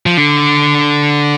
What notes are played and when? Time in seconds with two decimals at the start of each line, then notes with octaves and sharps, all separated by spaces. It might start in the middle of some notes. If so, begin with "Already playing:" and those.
0.06 F3
0.17 D3